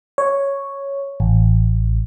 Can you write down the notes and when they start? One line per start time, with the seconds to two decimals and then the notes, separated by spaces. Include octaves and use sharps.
0.18 C#5
1.20 A1